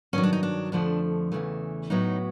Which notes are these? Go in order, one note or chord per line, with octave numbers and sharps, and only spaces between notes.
G2 D#3 F#3 C#4
D4
D#4
D4
F2 D3 F3 A3 D4
E2 C#3 E3 A3
A2 F#3 B3 D#4